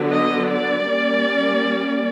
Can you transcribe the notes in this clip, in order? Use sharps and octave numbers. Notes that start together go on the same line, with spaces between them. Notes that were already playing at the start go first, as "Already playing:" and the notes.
Already playing: D3 F#3 B3
D#5
D5
G3 A#3 C#4